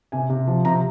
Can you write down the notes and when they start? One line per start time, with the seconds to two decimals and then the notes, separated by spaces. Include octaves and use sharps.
0.12 C3 G#5
0.30 C3
0.47 F3
0.65 C3 A#5